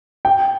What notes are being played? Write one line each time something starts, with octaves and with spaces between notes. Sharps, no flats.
G5